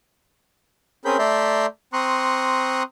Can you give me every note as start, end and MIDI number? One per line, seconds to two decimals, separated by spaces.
1.05 1.17 60
1.05 1.17 61
1.05 1.17 68
1.05 1.17 70
1.05 1.17 83
1.05 1.17 91
1.19 1.66 57
1.19 1.66 74
1.19 1.66 76
1.19 1.66 82
1.19 1.66 84
1.19 1.66 91
1.93 2.83 60
1.93 2.83 82
1.93 2.83 84
1.93 2.83 85
1.93 2.83 87
1.93 2.83 90